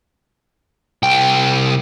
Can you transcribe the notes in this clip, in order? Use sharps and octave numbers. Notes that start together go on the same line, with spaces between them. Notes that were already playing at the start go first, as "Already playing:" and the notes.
C2 G5